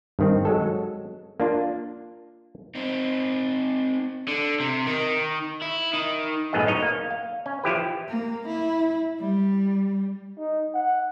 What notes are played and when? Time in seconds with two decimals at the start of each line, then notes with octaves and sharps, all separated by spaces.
0.19 G2 D#3 C4
0.45 F#3 G#3 A4
1.40 A#3 D4 F4
2.75 C4 D#4
4.28 D3
4.60 C3
4.87 D#3
5.62 E4
5.93 D#3
6.53 B1 F#2 A2 B3 G#4 D#5
6.67 C#4 D#4 C#5 D#5
6.82 A#3
7.11 F5
7.46 C#4
7.64 F3 E4 G4 B4
8.09 A#3
8.48 E4
9.20 G3
10.38 D#4
10.75 F#5